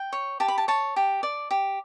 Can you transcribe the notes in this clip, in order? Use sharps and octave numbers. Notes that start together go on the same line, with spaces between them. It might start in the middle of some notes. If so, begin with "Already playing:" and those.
Already playing: G5
C#5
G4 A5
B5
A5
C#5 A5
G4
D5
G4